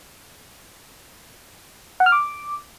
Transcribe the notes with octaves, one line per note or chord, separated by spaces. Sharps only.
F#5
F6
D6